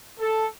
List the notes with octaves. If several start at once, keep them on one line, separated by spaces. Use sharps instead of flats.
A4